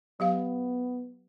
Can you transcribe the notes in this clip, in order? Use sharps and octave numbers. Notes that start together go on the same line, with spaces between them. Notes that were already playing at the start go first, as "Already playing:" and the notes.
F#3 B3 G4 F5